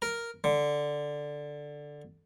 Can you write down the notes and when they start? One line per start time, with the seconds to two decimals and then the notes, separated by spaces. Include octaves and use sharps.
0.02 A#4
0.44 D3